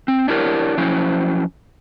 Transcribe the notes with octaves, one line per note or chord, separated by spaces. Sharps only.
C4
D4 E4 G4 A#4 C#5
F3 F#3 C#4 E4 C5